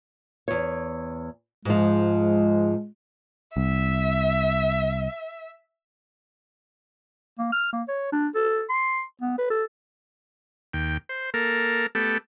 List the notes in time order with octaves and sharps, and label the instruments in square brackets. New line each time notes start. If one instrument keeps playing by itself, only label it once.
[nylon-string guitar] E2 C#5
[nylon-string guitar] G#2 F3 [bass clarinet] G#3
[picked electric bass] C2 [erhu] E5
[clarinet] A#3
F6
A#3
C#5
D4
A4
C6
B3
B4
A4
[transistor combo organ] D#2 G5
C5
A#3 A4 A#4
A3 B3 G4 A4